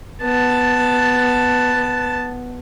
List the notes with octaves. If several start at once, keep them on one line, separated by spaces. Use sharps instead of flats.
B3 A5